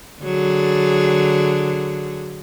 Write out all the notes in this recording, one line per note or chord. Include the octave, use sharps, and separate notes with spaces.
D3 F#3 G#4